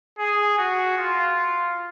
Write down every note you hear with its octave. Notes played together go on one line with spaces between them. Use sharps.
G#4
F#4
F4